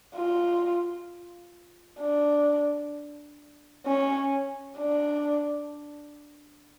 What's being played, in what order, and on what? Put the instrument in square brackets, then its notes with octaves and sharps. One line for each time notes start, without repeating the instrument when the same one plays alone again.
[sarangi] F4
D4
C#4
D4